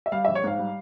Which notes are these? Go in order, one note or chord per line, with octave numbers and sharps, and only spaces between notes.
E5
G3 F5
E5
A#1
C#5
G#2 F5
G3